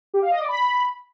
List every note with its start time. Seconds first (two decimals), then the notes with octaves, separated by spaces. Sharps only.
0.14 G4
0.22 F5
0.31 D#5
0.40 D5
0.48 B5